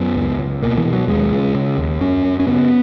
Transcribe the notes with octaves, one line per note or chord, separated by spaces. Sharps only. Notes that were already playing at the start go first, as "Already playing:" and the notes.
Already playing: F#2 B3
C#2
C#2
B2 A#3
E3
B2
F#3
D#2 G#3
C#3
C#3
D#2
F#2 C#4
F#2
C#4
C#3 B3